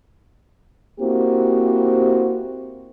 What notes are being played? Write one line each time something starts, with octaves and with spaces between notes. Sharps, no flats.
A#3 C4 E4 F#4 G4 C5